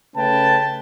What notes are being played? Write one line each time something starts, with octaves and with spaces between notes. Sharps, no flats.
C#3 A3 C#4 B4 G5 A5